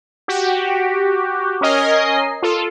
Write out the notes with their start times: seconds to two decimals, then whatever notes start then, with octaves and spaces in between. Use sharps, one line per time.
0.28 F#4 G4
1.61 C#4 A#4 D#5 G#5 C7
2.42 F4 A4